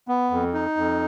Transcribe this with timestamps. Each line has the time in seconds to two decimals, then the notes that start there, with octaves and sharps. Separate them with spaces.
0.08 B3
0.31 F2
0.54 D#4
0.77 F2